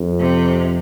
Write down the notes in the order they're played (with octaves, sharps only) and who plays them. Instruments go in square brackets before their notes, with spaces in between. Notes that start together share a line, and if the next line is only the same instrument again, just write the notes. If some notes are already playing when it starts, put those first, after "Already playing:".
Already playing: [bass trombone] F2
[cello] C3